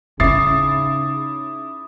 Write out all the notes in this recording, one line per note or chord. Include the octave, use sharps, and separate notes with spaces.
C#3 C#4 D#4 E4 D6 D#6 A6 C7